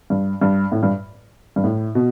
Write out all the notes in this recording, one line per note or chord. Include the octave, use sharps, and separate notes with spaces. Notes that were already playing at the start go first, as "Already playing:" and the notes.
G2
G2
A2
G2
G2
A2
B2